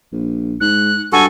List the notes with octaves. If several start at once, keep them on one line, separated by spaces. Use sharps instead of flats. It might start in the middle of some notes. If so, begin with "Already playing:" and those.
A#1
G#2 F#6
G2 F#4 A4 G#5